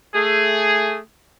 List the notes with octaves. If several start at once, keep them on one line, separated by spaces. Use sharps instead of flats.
A3 G#4